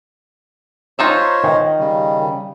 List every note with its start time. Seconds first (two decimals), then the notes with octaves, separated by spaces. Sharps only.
0.99 D#4 F4 C5 C#5 E5
1.44 D#3
1.79 C#3 G3